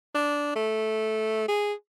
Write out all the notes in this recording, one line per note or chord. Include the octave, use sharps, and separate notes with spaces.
D4
A3
G#4